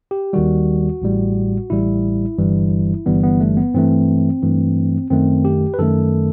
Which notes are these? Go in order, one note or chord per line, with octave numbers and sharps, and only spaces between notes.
G4
D#2 D#3 G3 F#4
A1 A2 G3
A1 A2 G3 E4
G1 G2 E3 G3
G1 G2 E3 G3 B3
B3
A3
B3
G2 E3 A3 C4
G2 E3 A3
F#2 D#3 A3 C4
G4
B4
F#2 D#3 A3 A4